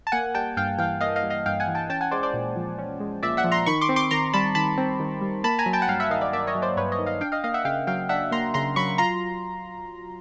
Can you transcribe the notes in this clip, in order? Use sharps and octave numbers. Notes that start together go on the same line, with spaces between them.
A5
A#3 F#5 G#5
G3 G5 A5
G2 F5 G5
E3 F5 G5
A#3 D#5 F5
D#5 F5
G3
D#5 F5
G2 F5 G5
F#5 G#5
E3
G5 A5
C#4 G5 A5
F#5 G#5
G#3 C5 D5
C5 D5
A#2
F3
C#4
G#3
A#2 D5 E5
E5 F#5
F3
A#5 C6
D#3 B5 C#6
C6 D6
C4
C6 D6
D#3 A#5 C6
G3 A5 B5
D#3 A5 B5
C4
D#3
G3
A#3 A5 B5
G#5 A#5
F#3
G5 A5
F#5
G2 F5 G5
E5 F#5
D#3 D#5 F5
D5 E5
A#3 D5 E5
C#5 D#5
F#3
C5 D5
G2 B4 C#5
C#5 D#5
D#3
D#5 F5
D4 F5 G5
D#5 F5
A#3 D#5 F5
E5 F#5
C#3 F5 G5
F#3 F5 G5
D4 E5 F#5
A#3 A#5 C6
C#3 A#5 C6
F#3 B5 C#6
F4 A#5 C6